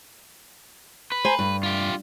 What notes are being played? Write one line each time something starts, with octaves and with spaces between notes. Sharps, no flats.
B4
C5 G#5 A#5
G2
F4 G4